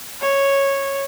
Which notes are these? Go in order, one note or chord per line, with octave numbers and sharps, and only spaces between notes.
C#5